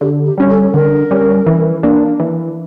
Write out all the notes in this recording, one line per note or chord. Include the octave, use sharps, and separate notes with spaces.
D3 G4
G4
G3 C#4
A4
D3 A#4
G3 C#4
E3
A#3 D4
E3